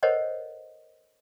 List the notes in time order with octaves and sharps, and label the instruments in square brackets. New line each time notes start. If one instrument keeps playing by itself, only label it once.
[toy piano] A4 A#4 C5 C#5 D#5 F#5